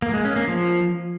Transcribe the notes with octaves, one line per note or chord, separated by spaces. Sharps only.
A#3
G#3
C#4
A#3
F3